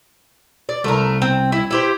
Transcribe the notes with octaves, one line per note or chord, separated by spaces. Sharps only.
D5
C2 A3 A#4
C4
E4
E4 G4 C5